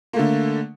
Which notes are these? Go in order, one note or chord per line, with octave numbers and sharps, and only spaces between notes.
D3 A3 A#3